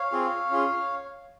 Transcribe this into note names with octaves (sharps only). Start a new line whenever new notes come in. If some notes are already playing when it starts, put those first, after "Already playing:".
Already playing: C#5 F5
C4 F4 G#4
C#4 F4 G#4